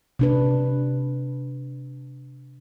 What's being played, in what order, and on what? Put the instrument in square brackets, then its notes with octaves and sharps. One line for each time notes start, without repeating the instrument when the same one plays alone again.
[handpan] C3 D4 B4